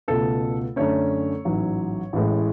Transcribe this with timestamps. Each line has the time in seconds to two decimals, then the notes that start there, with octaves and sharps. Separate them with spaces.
0.08 C#2 B2 A3 A4
0.76 F#2 D3 A3 C#4 C#5
1.45 A1 G#2 F#3
2.13 A1 A2 G#3